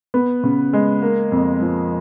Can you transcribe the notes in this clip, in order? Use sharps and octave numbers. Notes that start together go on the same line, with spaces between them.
B3
C#3
G#3
A#3
F2
F3